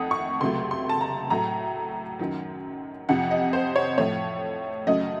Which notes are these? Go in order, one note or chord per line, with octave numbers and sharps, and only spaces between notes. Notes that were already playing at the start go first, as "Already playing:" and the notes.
Already playing: F2 D#3 A3 F#5 D#6
C#6
C#2 C3 F#3 A3 C6
C6
A5
A#5
A2 F#3 A3 A#5
F#2 D#3 F#3
F2 C3 F3 F#5
D#5
C5
C#5
A2 F3 A3 C#5
F#2 C#3 F#3 A3 D#5